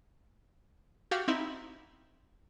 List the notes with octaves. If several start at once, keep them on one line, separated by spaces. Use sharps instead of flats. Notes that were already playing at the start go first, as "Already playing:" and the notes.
F#4 G4 F5 G5 A6 C#7
C4 D#4 E4 E5